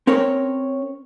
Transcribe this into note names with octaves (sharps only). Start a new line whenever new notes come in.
C4 C#4 A#4 C#5